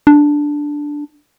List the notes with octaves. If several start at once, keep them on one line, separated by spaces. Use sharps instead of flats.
D4